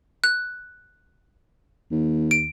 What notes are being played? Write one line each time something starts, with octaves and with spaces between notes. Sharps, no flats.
F#6
D#2
D7